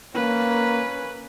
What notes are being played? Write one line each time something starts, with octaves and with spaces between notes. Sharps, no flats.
A#3 C#4 B4